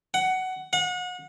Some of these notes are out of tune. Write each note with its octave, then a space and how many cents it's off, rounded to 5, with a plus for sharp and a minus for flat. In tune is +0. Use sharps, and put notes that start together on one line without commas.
F#5 +15
F#5 -35